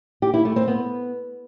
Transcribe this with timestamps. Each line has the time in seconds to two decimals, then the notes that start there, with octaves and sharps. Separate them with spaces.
0.22 G4
0.34 E4
0.45 A3
0.56 C4
0.68 B3